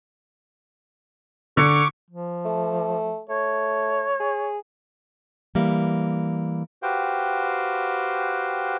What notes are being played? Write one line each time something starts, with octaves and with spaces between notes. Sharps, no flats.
D3 C#6 D6 C#7
F3
A3
A3 C#5
G#4
E3 G3 A#3
F#4 G4 B4 C5 F5 G5